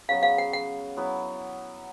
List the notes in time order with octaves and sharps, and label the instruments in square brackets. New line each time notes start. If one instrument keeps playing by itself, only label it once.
[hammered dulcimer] C#3 F#3 B3 [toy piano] F5
[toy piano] F5
F#5
F#5
[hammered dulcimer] F#3 B3 E4